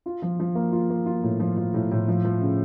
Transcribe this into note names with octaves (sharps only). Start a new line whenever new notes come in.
F4
F3
F3
A#3
F4
A#3
F4
A2
F3
F3
A2
A2
F3
F3
C#3